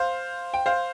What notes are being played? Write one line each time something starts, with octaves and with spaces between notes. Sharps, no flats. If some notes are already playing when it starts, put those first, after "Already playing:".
Already playing: C5 F5
G5
C5 F5